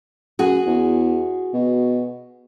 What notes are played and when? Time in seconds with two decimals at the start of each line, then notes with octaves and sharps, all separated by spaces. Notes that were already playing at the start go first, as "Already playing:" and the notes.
0.39 F#2 F#4 G#4
0.66 E2
1.53 B2